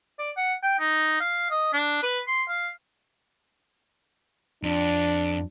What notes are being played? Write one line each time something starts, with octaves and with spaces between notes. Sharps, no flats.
D5
F#5
G5
D#4
F5
D#5
D4
B4
C6
F5
F2 D4